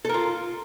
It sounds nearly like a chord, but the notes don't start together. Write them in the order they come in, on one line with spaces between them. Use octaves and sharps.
A4 A#4 F4